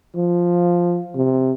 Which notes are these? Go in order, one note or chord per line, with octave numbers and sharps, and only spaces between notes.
F3
C3